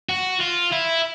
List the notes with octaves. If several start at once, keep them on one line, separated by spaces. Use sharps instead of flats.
F#4
F4
E4